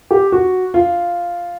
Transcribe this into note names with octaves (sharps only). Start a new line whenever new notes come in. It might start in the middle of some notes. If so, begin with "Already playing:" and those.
G4
F#4
F4